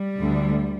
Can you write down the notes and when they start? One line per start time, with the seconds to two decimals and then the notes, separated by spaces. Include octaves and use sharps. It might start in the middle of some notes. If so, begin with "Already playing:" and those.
Already playing: G3
0.21 D2 D3